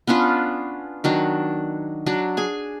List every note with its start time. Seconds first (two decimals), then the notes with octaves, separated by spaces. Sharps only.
0.07 B3 C#4 D4 F4
1.04 D#3 F#3 D4
2.06 F#3 D4
2.37 G#4 G#5